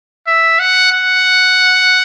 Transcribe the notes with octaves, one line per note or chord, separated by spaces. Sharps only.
E5
F#5
F#5